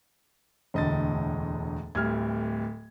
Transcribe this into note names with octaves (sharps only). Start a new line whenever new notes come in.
E1 D2 A2 D#5 A6
D1 D2 G3 F6 G#6